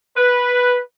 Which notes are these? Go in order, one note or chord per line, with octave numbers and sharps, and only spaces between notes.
B4